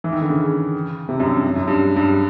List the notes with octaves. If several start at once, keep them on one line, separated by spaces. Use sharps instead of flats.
E3
D#3
D3
C#3
C3
F#2
G2
F#2
F#2
G2
G2